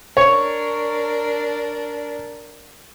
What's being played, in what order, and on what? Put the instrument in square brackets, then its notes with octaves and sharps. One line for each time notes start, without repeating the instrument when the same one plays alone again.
[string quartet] D4 A#4 [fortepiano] C#5